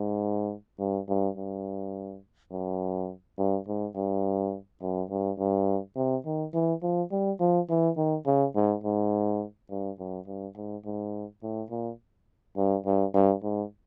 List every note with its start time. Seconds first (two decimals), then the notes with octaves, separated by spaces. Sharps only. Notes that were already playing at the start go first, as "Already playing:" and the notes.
Already playing: G#2
0.79 G2
1.09 G2
1.37 G2
2.51 F#2
3.38 G2
3.67 G#2
3.96 G2
4.82 F#2
5.10 G2
5.38 G2
5.96 C3
6.26 D#3
6.54 E3
6.82 F3
7.11 G3
7.40 F3
7.69 E3
7.97 D#3
8.26 C#3
8.55 G#2
8.84 G#2
9.70 G2
9.99 F#2
10.27 G2
10.57 G#2
10.85 G#2
11.43 A2
11.70 A#2
12.57 G2
12.85 G2
13.14 G2
13.43 G#2